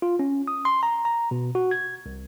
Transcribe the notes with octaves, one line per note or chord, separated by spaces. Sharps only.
F4
C#4
D#6
C6
A#5
A#5
B2
F#4
G#6
C2